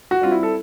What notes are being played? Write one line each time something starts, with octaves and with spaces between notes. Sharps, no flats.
F#4
G3 C4 F4
E4
A4